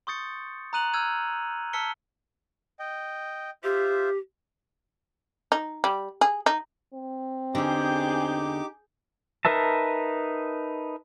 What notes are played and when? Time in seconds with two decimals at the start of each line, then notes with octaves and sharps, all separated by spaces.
0.07 C6 C#6 D#6 G6 A6 C#7
0.73 A#5 D#6 F#6 D#7 F7 F#7
0.94 E6 F6 G6 G#6 D#7
1.73 A5 E6 F6 B6 C#7 G7
2.79 D#5 G5
3.64 F4 G4 C5 E5
5.52 D#4
5.84 G3
6.21 G#4
6.46 D#4
6.94 C4
7.55 E2 D3 D#4 G4 G#4 D6 G6
9.45 D#4 A#4 B4 E5 A5